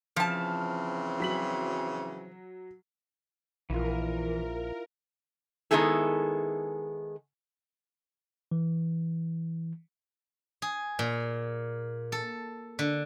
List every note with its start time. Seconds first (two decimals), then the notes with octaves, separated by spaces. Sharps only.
0.16 C#3 E3 F3 C4 A5 F6 E7
1.20 F#3 B6 F#7
3.70 A#1 E3 E4 F4 A#4
5.71 D#3 G#3 B3 E4 G#4 A4
8.51 E3
10.62 G#4
10.99 A#2
12.12 A4
12.79 D3